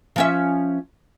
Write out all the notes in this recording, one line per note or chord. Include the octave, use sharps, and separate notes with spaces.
F3 C#4 E5